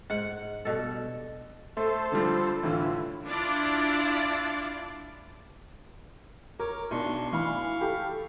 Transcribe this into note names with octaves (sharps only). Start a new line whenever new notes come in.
G#2 F#5
G2 B2 A4
A3 A4 C5
D3 F3 G3
A2 D3 E3 F4
D4 E4 F4 D5
A#4 C#5 D6
B1 D4 C6 C#6
E3 F5 B5 C#6
G4 A4